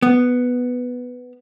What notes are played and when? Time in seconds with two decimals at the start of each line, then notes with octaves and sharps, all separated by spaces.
0.02 B3